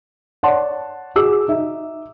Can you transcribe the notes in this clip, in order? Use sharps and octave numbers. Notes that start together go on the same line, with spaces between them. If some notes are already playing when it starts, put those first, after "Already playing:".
C#5 D5 F#5 A5 C6
F#4 G#4 D6 E6
D#4 E5